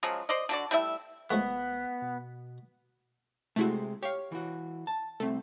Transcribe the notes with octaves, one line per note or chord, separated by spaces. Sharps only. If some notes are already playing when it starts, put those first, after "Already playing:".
C#3 F3 F#3 G#3
C5 D5 D#5
D3 F#4 D5
G3 A3 E4 E5
F1 F3 G#3 A3 B3
B2
C3 G#3 A3 C4 E4 F#4
G4 C#5 F5
E3 F#4
A5
C2 A3 C4